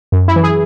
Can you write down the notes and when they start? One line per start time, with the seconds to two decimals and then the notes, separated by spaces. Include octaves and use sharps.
0.12 F#2
0.28 E4
0.36 E3
0.43 G#4